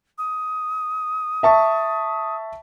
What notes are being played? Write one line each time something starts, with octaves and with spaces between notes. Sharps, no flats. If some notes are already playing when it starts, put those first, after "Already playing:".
D#6
E5 A5 C#6